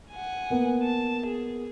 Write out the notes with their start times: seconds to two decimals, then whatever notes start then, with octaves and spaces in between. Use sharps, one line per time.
0.11 F#5 G#5
0.50 A#3 B3
0.83 A5
1.27 G#4